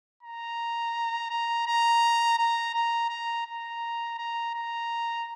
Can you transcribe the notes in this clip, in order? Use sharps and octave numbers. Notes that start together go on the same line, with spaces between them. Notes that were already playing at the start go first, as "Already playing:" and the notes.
A#5
A#5
A#5
A#5
A#5
A#5
A#5
A#5
A#5